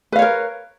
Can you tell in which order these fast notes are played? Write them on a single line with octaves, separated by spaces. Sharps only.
B4 F5 C#5 A#4